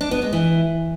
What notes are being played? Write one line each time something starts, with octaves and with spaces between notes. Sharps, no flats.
D4
B3
G#3
E3